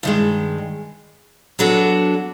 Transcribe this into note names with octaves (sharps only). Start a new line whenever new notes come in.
G2 D#3 G#3
F#3 B3 D4 F#4 A4